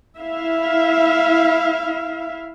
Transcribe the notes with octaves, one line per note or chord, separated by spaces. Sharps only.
E4 E5 F5